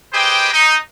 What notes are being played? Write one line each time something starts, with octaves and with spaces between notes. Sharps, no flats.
G4 G#4 B4 C5 D#5 G5
D#4